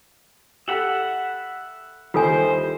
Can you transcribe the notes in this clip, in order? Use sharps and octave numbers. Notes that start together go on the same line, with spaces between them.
G4 A4 E5 F#5 B5
D#2 E3 G3 F4 A4 C5 G#5